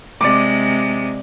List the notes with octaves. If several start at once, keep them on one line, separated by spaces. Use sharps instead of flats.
C3 G#3 D5 D6